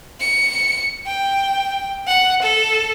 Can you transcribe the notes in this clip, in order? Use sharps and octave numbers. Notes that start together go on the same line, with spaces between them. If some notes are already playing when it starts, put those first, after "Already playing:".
C#7
G5
F#5
A4